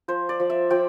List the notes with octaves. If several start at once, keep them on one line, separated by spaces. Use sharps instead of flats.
F3 C5
D5
F3
E5
F3 G5